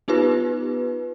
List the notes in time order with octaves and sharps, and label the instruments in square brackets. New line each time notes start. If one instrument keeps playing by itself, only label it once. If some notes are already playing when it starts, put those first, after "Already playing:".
[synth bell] B3 D#4 F4 G4 B4